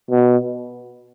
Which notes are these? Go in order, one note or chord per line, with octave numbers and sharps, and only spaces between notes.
B2